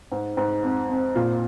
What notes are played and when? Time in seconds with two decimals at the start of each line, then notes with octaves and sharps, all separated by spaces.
0.12 G#2
0.37 G#2
0.63 F2
0.90 F2
1.15 A#2 F4